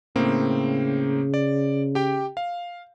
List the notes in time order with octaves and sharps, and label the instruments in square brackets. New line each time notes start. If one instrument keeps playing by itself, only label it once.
[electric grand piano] A2 A#3 C4 [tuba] C#3
[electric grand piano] D5
G4 G5
F5